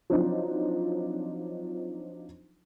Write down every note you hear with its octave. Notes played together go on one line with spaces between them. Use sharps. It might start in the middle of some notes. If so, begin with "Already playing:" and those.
F3 F#3 C4 D4 D#4 F4